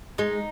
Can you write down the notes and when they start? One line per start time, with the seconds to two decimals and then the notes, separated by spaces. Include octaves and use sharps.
0.18 G#3 D#4